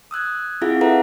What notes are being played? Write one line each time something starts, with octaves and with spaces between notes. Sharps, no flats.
D#6 E6 F#6 G#6
C4 E4 F4 G#4 F5 F#5
G#4 A4 B4 E5 F#5 A#5